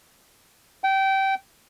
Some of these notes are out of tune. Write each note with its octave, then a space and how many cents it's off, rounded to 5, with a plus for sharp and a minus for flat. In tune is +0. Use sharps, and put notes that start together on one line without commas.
G5 -20